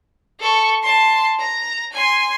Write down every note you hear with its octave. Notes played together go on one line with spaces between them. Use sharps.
A4 C#6
A5 C6
A#5
G#5 C6